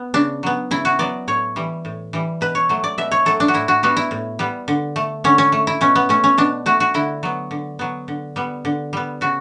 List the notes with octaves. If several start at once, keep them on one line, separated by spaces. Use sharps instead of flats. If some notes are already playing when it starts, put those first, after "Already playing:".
Already playing: B3
C#3 D4
F#3 B3
C#3 E4
F#4
F#3 B3 D5
A2 C#5
E3 G3
A2
E3 G3
B2 B4
C#5
F#3 A3
D5
B2 E5
C#5
F#3 A3 A4
D4
F#4
A2 E4
F#4
G3 B3 F#4
E4
A2
G3 B3
D3
A3
D3 C#4
C#4
A3
E4
B2 C#4
B3
A3 C#4
C#4
B2 D4
A3 F#4
F#4
D3 E4
F#3 B3
D3
F#3 B3
D3
G3 B3
D3
G3 B3
C#3 F#4